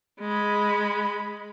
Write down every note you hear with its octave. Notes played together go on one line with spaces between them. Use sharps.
G#3 B5